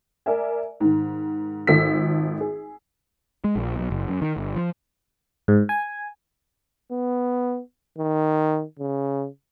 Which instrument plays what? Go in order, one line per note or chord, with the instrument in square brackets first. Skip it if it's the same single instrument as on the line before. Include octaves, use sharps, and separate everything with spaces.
[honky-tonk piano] A#4 D5 E5 G#5
G#2 D#3
G#1 F4 A4 E6 B6
G#4
[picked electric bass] G#3
A#1
B1
F#1
F#2
D#3
G1
F3
[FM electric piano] G#2
G#5
[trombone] B3
D#3
C#3